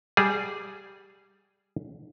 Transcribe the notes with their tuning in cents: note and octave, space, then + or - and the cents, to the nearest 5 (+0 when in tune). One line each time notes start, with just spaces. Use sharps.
G3 +0 G#4 +0